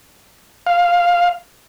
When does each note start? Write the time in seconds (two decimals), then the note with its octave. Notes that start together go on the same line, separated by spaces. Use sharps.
0.67 F5